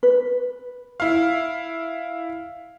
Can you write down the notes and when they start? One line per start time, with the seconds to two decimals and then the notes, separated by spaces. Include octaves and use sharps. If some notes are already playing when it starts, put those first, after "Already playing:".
0.03 B4
1.00 E4 F5